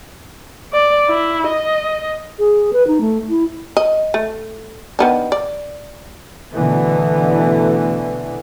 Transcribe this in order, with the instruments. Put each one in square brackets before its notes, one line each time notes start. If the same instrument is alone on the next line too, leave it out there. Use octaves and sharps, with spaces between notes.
[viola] D5
E4
D#5
[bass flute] G#4
B4
D#4
A3
E4
[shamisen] D#5
A3
D#3 B3 D4
D5
[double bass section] B2 D3 E3 A3 B3